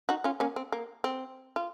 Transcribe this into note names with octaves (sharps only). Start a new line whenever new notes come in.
D#4 F#4
C#4 F4
A#3 C#4
C4
A#3
C4
F4